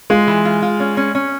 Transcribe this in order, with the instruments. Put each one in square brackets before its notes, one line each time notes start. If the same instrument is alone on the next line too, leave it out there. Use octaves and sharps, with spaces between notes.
[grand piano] G#3 [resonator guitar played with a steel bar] F4
[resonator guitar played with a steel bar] E3
F4
F4
C#4
C#4
C#4